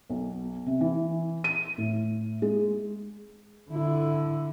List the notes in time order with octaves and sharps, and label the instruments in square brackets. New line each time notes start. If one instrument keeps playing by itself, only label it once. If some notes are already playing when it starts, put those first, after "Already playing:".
[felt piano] B1
C3
E3
D#7
A2
G#3
[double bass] D3 E4